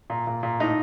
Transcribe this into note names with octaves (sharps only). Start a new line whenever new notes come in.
A#2
A#2
A#2
A2 D#4